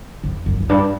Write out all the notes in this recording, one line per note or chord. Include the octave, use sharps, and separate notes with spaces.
F2
F#2
F#2
G2